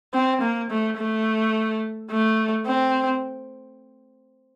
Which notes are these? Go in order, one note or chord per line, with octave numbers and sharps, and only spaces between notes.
C4
A#3
A3
A3
A3
C4